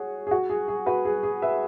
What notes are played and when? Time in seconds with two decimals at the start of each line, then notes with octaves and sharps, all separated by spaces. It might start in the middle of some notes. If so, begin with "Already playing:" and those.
Already playing: F#4 G#4 C#5
0.27 G#4
0.31 F#4
0.50 G#4
0.68 G#4
0.86 F#4 B4
1.05 G#4
1.23 G#4
1.42 B4 E5